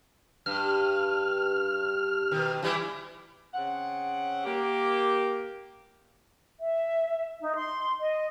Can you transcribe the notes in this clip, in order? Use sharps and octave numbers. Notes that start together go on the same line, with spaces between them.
G2 F6
B2 D#3
E3 G3 E4
C#3 C4 F#5
A#3 G4
E5
D#4
C6
D#5